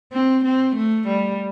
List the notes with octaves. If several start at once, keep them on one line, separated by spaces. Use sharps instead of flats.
C4
C4
A3
G3